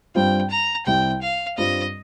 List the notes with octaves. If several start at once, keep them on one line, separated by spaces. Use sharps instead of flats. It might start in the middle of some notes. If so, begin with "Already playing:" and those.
G2 G3 C4 F4 G5
A#5
C2 C3 G3 G5
F5
G2 G3 C4 F4 D#5